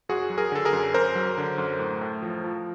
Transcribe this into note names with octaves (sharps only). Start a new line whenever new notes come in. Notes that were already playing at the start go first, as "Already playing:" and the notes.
F#2 F#4 G#4
F#3
G#4 A#4
D3 A4
G#4 A#4
F#2
F#2 A#4 C5
F#3
D3
F#2
A2
A2
F3
F3